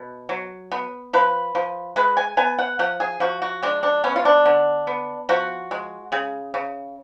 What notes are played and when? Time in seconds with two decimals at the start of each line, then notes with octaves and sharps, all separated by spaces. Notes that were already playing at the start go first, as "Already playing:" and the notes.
Already playing: B2
0.29 F#3
0.72 B3
1.13 F3 B4
1.55 F3
1.96 G#3 B4
2.17 G#5
2.37 B3 G#5
2.59 F#5
2.79 F3 F#5
3.00 G#4
3.20 F3 F#4
3.42 F#4
3.63 G#3 D4
3.83 D4
4.04 B3 C#4
4.16 F4
4.25 D4
4.46 D3
4.87 B3
5.29 F3 F#4
5.71 G#3
6.12 C#3 G#4
6.54 C#3